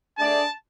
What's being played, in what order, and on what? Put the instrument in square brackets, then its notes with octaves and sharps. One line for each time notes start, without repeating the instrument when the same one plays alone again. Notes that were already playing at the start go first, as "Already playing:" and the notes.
[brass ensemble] A3 D4 G#4 D5 [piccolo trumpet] A5